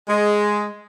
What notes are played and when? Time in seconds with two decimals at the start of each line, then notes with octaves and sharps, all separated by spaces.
0.08 G#3